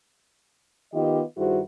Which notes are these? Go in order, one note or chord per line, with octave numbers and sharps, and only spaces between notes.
D#3 B3 F4 G4 D#5
G2 D#3 E4 F#4 G#4 C5